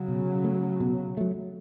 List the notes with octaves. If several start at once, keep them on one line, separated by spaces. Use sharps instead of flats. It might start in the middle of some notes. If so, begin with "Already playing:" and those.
Already playing: C#3 F#3
B2
A3 C#4
B2
F#3 A3